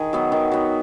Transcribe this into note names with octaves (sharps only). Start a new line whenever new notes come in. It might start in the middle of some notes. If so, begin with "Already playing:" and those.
Already playing: D#3 G#4
F#3 B3
D#3
F#3 B3